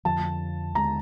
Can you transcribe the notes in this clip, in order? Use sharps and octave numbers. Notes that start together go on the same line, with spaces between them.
F2 D3 F3 A5
D#2 D3 F3 G#3 A#5